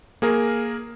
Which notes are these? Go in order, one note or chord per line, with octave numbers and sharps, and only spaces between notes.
A#3 G#4 A#4